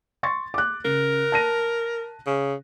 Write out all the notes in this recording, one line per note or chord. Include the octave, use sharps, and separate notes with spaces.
C6 C#6 A6
D6 F#6
C#3 A#4
A5 A#6 D#7
C#3